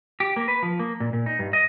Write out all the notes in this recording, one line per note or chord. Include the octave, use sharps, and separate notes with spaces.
G4
A#3
B4
F3
A#3
A#2
A#2
D#4
G2
D#5